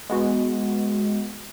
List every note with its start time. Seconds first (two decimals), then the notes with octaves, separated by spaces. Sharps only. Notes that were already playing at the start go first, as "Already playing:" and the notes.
0.10 G#3 B3 F#4